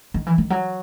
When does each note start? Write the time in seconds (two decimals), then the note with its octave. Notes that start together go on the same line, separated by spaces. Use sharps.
0.14 D#3
0.26 E3
0.38 D#3
0.50 F#3